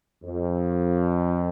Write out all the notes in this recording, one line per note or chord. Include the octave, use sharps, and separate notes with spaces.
F2